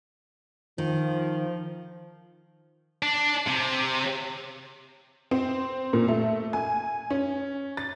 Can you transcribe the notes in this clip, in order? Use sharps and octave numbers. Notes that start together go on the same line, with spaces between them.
D#3 F3
D4
C3
C4
A#2
A3
G#5
C#4
A6